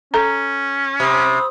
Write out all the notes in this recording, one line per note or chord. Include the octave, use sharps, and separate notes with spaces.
C#4 A4 A#5
C3 B5 D#6 E6